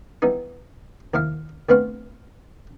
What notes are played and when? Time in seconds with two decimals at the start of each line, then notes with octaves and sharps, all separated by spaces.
0.22 E3 G3 B3 D#4
1.14 D#2 F3 E4 F5
1.69 D2 B3 C4 B4 F5 C#6